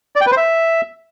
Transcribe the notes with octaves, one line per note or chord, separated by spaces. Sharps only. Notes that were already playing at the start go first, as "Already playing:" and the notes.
D5
G5
B4
C5
E5